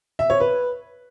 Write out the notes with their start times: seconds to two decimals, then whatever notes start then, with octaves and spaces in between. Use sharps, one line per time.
0.19 E5
0.30 C#5
0.40 B4